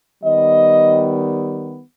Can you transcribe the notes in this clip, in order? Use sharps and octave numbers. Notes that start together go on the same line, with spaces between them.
D#3 G3 B3 D#5